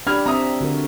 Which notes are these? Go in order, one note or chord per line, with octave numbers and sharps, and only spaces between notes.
D4 G4 B5 F6 G#6
C4 E5 A#5 D#6
D3 F#4 A#4